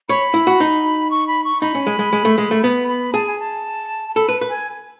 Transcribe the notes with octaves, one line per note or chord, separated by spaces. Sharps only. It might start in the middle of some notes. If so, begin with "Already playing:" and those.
C#5 B5
E4
F#4
D#4
C#6
B5
C#6
D#4 B5
C#4
G#3
G#3
G#3
A3
G#3
A3
B3 B5
B5
G#4 A5
G#5
A5
A5
A4 B5
B4
B4
G#5